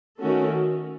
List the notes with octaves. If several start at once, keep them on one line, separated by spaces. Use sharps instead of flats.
D#3 A3 C#4 F#4 A4